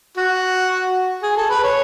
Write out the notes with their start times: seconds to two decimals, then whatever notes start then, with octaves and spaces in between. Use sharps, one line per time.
0.17 F#4
1.23 G#4
1.36 A4
1.50 B4
1.64 C#5